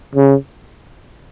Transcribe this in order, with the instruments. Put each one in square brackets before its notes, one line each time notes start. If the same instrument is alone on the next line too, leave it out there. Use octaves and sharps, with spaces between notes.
[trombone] C#3